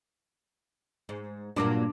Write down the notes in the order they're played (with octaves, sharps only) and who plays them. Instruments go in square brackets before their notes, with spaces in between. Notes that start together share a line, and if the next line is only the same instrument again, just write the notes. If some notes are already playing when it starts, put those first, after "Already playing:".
[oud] G#2
[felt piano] G2 D6 [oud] A#2 F#3 A#3